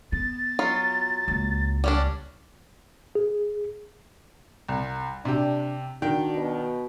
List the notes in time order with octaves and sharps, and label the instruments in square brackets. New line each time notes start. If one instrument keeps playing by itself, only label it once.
[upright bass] B3 [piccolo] A6
[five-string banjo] F#3 F4
[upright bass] C#2 A#3
[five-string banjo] G3 C#4 D4
[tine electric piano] G#4
[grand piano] C2
[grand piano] C3 G4 [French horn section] D4
[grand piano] D#3 G5 [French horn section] D4 [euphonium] F#4
[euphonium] B2